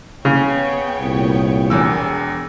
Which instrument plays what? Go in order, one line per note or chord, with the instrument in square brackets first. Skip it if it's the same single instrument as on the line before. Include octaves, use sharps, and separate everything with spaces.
[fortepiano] C#3 [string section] B3 C#5 G5
[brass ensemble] C2 A#2
[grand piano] E1 E2 E6